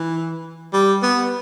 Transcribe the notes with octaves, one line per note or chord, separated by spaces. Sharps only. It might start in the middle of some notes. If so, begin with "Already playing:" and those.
Already playing: E3
G3
B3